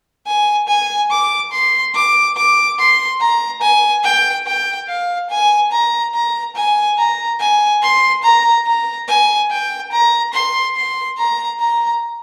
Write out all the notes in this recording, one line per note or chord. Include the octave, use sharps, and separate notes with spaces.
G#5
G#5
D6
C6
D6
D6
C6
A#5
G#5
G5
G5
F5
G#5
A#5
A#5
G#5
A#5
G#5
C6
A#5
A#5
G#5
G5
A#5
C6
C6
A#5
A#5